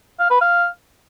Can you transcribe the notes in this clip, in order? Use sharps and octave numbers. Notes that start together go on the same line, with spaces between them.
F5
B4
F5